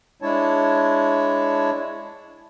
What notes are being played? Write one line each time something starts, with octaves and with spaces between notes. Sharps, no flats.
G#3 D4 E4 C#5 A5